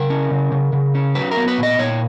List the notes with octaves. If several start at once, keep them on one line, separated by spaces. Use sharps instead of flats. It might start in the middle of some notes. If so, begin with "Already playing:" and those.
Already playing: C#3 A#4
C#4
C#3
C#3
C#3
C#4
F#3 B4
A#4
B3
B4
A#2
D#5
A#2 C#5